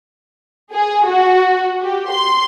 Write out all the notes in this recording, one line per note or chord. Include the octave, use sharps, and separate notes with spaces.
G#4
F#4
G4
C6